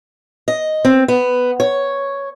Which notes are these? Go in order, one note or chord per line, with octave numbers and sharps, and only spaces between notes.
D#5
C4
B3
C#5